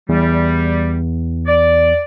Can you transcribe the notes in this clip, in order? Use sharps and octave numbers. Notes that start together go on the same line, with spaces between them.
E2 G3
D5